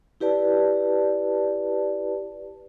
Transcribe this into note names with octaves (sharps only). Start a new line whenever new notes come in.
E4 G4 B4 D5 A5